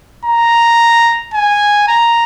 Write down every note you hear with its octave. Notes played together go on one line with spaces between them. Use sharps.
A#5
G#5
A#5